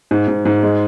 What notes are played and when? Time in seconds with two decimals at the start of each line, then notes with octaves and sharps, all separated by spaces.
0.11 G#2
0.28 G#2
0.45 G#2
0.63 G#3